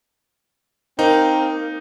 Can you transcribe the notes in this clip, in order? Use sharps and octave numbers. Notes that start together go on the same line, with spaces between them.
A#3 C4 D#4